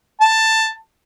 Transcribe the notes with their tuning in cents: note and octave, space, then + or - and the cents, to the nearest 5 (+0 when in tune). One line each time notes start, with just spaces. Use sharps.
A5 +10